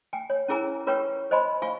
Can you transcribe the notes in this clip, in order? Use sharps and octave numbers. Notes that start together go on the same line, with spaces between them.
G5 G#5
C#5
C#4 E4 G#4 A#4 G#5 A#5
F4 A#4 B4 C#5 G5 C#6
C5 D#5 G#5 B5 C6
F4 F5 G#5 C#6